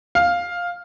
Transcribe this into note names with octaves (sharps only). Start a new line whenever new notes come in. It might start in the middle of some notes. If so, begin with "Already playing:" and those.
F5